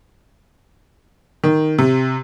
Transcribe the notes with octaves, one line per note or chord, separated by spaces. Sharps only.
D#3
C3